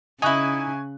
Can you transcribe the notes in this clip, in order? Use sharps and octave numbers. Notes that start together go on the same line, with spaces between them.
C#3 D#4 E4 G#5 C#6 F#6